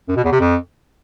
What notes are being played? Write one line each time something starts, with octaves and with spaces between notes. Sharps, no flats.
F#2
B2
E2
C3
F2